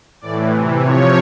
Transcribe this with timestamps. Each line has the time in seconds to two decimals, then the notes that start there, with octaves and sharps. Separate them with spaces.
0.21 A2 E3 D5
0.51 C3 E3
0.80 C3 F3 C#5